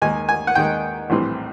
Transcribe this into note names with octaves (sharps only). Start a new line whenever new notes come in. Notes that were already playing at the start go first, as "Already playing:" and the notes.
D#2 D#3 G#3 G#5
G#5
F#5
D#2 D#3 G#3 G5
A#1 A2 E3 G3 C4